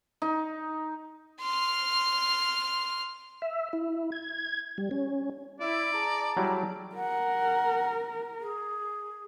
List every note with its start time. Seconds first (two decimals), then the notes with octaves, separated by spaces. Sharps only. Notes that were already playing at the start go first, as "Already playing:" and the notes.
0.22 D#4
1.42 C6 F6
3.42 E5
3.73 E4
4.12 G#6
4.78 G3
4.91 C#4
5.60 E4 D5
5.92 G#4 A5 A#5
6.37 F#3 G3 E4
6.96 A#4 F#5
8.41 G#4